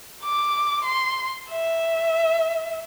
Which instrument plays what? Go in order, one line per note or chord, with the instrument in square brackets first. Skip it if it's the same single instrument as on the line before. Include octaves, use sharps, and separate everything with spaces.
[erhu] D6
C6
E5